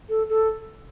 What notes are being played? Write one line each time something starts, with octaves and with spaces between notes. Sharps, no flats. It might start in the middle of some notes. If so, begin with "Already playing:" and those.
A4
A4